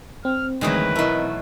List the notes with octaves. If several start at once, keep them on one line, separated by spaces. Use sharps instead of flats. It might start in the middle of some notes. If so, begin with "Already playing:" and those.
C4 F6
D2 D#3 E3 F#3 G#3 B4 D#6
B2 A3 E4 A#4 D#5